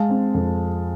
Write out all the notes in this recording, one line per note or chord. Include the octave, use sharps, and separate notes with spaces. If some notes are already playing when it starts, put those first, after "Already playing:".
Already playing: G#3 F5 A5
C4
F2